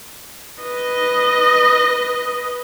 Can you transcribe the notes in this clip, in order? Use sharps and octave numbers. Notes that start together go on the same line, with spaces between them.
B4 D#5